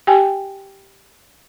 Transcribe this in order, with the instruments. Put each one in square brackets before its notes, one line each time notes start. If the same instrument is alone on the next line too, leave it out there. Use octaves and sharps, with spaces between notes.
[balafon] G4 G5 G#5